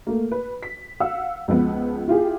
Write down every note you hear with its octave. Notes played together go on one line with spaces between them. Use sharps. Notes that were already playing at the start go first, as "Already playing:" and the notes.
A3 A#3
B4
B6
F5 F#5 E6
C#2 F3 B3
E4 F4 G4 G#4